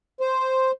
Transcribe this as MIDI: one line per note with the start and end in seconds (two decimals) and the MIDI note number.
0.21 0.71 72